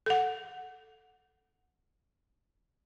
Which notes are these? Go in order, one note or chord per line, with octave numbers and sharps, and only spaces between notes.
A4 F#5